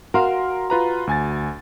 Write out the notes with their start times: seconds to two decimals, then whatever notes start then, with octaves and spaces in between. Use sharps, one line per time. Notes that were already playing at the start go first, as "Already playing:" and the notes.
0.14 F#4 A#4 F5 C6
0.70 F4 B4 A#5
1.07 D2 G#5 A6